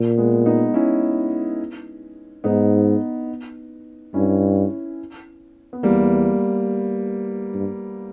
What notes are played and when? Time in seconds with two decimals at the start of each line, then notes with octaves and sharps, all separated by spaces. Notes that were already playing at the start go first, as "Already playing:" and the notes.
Already playing: A#2
0.18 G#3 B3
0.46 B3 D#4
0.74 C#4 E4
2.44 G#2 B3 D#4
4.14 G2 C#4 E4
5.73 B3
5.83 E2 G3 A#3
7.54 G2